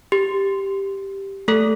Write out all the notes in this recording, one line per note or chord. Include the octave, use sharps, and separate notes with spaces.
G4
A3 A4